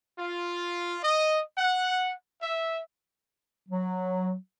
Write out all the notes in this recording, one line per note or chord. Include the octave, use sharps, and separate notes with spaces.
F4
D#5
F#5
E5
F#3